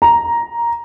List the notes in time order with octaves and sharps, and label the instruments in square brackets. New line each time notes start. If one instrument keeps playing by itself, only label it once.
[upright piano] A#5